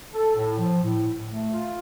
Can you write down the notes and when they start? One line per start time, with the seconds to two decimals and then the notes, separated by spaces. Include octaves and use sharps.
0.13 A4
0.36 A2
0.59 F3
0.83 A2
1.05 A2
1.28 A3
1.51 F4